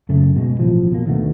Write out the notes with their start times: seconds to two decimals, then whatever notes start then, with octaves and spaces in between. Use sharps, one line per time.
0.09 F#2 C#3 A3
0.36 B2 G#3
0.59 A1 F3
0.91 B2 A#3
1.06 D2 D#3 A3 B3